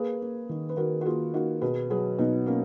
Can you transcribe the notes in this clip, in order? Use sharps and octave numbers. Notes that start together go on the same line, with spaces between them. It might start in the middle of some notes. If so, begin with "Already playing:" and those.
Already playing: A#3 G#4 B4
A#3
D#3
B4
D#3 F#4 A#4
F#4
A#3 F4 G#4
A#3 D#4 F#4
B2 G#4 B4
F#3 G#4 B4
B2 B3 D#4
A#3 C#4